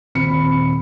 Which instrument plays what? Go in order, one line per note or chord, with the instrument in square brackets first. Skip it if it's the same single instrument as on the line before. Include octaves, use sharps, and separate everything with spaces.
[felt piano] D#1 C4 B5 C#7